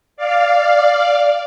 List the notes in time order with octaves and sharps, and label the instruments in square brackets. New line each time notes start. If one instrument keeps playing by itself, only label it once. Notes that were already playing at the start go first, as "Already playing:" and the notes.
[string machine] D5 F5